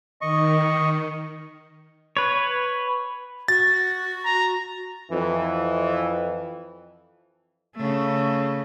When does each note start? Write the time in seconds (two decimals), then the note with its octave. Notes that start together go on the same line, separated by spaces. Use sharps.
0.21 D#3 D#5 C#6
2.17 B4 C#5
3.48 F#4 A6
4.25 A#5
5.11 F2 E3
7.76 C#3 A3